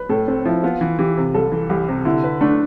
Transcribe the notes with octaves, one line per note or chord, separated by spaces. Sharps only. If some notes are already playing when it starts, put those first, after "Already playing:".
Already playing: B4
A2 A4
A2 C4
F3 E4
B3 F4
E3
E3 G4
C3
C2 A4
E3
C2 G4
C3
D3 E4
B4
A3 D4